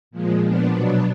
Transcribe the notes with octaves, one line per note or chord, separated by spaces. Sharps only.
A#2 F3 G#3
A#2 F3 B3 D4
B2 F#3 B3 D4